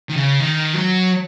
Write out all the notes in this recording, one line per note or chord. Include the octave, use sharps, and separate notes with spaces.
D#3
C#3
D#3
F#3